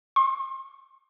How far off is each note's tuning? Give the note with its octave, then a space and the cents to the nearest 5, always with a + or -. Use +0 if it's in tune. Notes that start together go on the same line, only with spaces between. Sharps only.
C6 +35